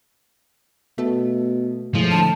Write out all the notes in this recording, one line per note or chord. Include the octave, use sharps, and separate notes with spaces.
B2 A3
A2 F3 G#3
D3 A5